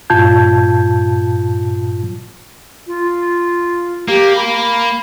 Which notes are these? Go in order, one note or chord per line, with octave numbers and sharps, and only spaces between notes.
G2 A#2 F4 A5 G6 G#6
F4
A#3 G4
B5